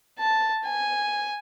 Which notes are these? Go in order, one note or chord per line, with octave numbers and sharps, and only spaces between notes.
A5
G#5